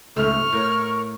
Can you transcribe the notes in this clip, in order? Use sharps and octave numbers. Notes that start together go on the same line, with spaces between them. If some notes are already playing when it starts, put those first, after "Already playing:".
C#2 G#2 A3 C#6 F6
A2 A#4 C#5